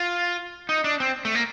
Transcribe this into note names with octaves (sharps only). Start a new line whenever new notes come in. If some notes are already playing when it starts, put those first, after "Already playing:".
Already playing: F4
D#4
D4
C4
A3
A#3